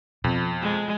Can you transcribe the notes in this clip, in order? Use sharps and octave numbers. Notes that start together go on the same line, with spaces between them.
F2 B2
G#3